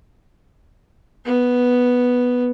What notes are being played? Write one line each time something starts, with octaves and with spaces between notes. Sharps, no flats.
B3